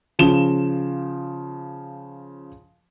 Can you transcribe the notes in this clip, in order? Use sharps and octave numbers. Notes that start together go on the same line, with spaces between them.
C#3 F3 E7 G7